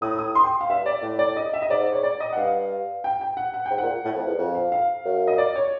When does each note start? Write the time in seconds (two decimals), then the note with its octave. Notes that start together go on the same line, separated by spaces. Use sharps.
0.02 A2 D#6
0.19 D#6
0.35 C6
0.44 G5
0.61 F5
0.70 G2 E5
0.86 D5
1.03 A2
1.19 D5
1.36 D#5
1.53 E5
1.62 D#5
1.69 G#2 D5
1.93 C#5
2.03 D5
2.20 D#5
2.32 F#5
2.36 G2 F5
3.04 G5
3.21 G5
3.37 F#5
3.54 F#5
3.66 G#2 G5
3.78 A#2 F#5
4.05 A2
4.15 F2
4.27 E2
4.38 F2
4.55 F5
4.72 F5
5.05 F#2
5.27 D#5
5.38 D5
5.56 C#5